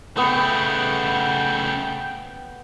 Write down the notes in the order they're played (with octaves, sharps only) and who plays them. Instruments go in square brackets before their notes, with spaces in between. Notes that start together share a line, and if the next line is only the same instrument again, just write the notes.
[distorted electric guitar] C#3 A3 [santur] B3 C#6 [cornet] G5